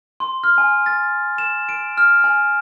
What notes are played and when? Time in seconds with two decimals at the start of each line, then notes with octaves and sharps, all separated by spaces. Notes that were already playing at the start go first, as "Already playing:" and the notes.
0.20 C6
0.44 F6
0.58 G#5
0.86 A6
1.38 E7
1.69 D7
1.98 F6
2.24 G#5